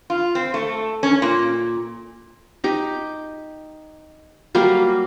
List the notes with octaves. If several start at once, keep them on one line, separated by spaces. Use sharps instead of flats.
F4
C4
A3
C#4
A#2
D#4 G4
F#3 G3 A#3 F5